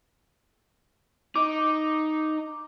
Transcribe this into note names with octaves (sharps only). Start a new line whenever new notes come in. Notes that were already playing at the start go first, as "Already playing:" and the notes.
D#4 D6